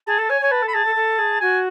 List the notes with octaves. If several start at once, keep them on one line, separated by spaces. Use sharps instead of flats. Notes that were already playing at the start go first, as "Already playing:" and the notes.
G#4 A5
A4
C#5 G#5
C#5 G#5
B4 A5
A4
B5
G#4 A5
A4
A4
G#4
F#4 G#5